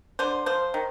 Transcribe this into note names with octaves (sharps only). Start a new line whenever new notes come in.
D3 C5
F3 C5
D#3